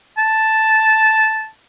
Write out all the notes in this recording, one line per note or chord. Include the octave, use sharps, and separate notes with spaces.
A5